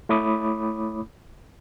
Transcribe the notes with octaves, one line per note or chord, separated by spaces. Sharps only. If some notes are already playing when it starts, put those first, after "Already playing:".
A3 E4 C#5 B5 D6 D#6